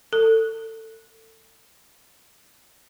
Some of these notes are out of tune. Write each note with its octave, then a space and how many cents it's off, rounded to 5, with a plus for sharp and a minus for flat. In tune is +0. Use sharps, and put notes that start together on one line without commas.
A4 +25